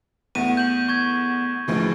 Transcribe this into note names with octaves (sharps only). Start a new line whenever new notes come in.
E2 A3 B3 F#5 D#7
G6 F#7
C#6 G#6
D2 A2 C#3 E3 F3 G#3